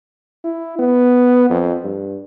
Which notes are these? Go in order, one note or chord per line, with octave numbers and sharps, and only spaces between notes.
E4
B3
F2
G2